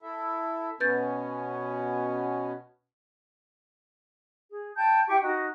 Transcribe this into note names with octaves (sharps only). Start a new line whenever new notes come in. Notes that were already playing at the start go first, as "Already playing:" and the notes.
E4 A4 E5
B2 B3 C#4 B4 G6 A6
G#4
G5 A5 G6
E4 G4 G5 C#6
D#4 F#4